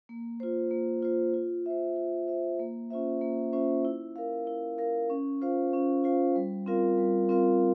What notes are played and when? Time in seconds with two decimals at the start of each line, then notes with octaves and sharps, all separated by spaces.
0.09 A#3
0.40 F4 C5
0.71 A#3
1.02 F4 C5
1.34 F4
1.66 C5 E5
1.96 F4
2.28 C5 E5
2.60 A#3
2.90 C#4 F4 C5 E5
3.21 A#3
3.53 C#4 F4 C5 E5
3.85 E4
4.16 A#4 F5
4.47 E4
4.78 A#4 F5
5.10 C#4
5.41 F4 C5 F5
5.73 C#4
6.04 F4 C5 F5
6.36 G3
6.66 C4 F4 A#4 F5
6.98 G3
7.29 C4 F4 A#4 F5